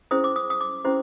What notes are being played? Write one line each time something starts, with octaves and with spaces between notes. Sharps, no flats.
C#4 E4 G#4 C5 D#6
D6
D#6
D#6
D6
C#4 E4 G4 C5